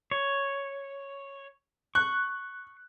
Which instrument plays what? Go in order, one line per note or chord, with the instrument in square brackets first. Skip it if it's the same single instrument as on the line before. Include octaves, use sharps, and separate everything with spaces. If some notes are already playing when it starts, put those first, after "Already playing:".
[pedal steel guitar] C#5
[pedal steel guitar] C#6 [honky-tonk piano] F#6